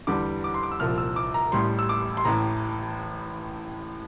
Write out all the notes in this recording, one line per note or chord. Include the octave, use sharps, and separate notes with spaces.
E2 D3 G3 D6
D6
C6
D6
E6
C2 A#2 F3 F6
E6
D6
A#5
A1 A2 G3 C6
E6
D6
C6
A1 A2 E3 A#5